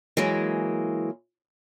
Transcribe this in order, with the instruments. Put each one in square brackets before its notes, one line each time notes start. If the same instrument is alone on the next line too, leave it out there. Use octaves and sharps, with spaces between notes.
[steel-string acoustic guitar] E3 F#3 G#3 A#3